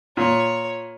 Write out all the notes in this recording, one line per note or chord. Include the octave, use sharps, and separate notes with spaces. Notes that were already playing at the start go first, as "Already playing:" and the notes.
A#2 C#5